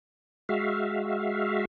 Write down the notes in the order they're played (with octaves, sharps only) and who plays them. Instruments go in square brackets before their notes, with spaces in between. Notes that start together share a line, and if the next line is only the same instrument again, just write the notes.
[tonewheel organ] G#3 F#4 E5 F5